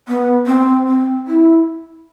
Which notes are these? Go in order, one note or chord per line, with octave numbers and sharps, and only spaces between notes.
B3
C4
C4
E4